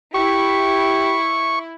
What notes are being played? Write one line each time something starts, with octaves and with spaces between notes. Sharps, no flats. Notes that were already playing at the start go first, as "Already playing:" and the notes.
E4 G4 C#6